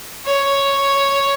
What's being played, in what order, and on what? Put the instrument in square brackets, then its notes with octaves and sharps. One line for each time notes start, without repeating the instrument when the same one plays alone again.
[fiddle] C#5